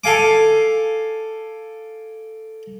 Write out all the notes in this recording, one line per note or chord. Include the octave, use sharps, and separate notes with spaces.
A4 F5 G#5 D6